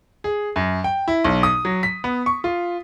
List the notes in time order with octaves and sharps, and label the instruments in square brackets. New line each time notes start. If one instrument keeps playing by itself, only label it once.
[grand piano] G#4
F#2
G5
E4
B1
D#6
F#3
B6
B3
C#6
F4